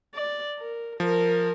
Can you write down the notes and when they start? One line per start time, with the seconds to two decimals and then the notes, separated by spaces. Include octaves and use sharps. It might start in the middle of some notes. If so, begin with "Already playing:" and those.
0.15 D5
0.59 A#4
1.00 F3 A#4